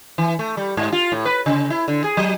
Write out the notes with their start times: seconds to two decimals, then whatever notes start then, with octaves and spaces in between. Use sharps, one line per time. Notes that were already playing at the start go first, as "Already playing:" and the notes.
0.18 E3
0.39 A3
0.57 G3
0.77 G#2
0.92 F4
1.12 A2
1.25 B4
1.46 C#3
1.70 E4
1.88 D3
2.04 G#4
2.17 F#3